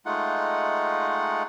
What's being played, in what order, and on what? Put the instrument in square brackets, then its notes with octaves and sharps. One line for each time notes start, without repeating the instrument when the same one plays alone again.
[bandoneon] G#3 A3 D#4 F4 F#5